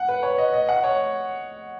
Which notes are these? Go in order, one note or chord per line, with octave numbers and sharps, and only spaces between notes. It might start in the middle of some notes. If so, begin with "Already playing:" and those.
Already playing: F#5
B4
C#5
D#5
D#5
F#5
C#5